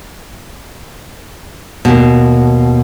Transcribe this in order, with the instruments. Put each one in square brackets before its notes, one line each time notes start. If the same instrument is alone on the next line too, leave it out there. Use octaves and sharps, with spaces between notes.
[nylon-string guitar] D#2 B2